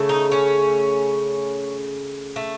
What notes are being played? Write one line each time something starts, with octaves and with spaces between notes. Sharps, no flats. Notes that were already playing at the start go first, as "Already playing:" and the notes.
Already playing: C#3 A3
D#4
C#4
A3